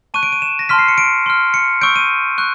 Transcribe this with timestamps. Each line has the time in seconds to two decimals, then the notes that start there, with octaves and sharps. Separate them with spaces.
0.14 A5 C#6 F#6 D#7
0.23 D7
0.32 D#7
0.42 E7
0.59 A#6
0.69 A5 C6 F6 B6
0.79 C7
0.88 C#7
0.98 D7
1.26 C6 F6
1.54 C#7
1.81 C#6 E6 G6 D7
1.96 D#7
2.38 C#6 F#6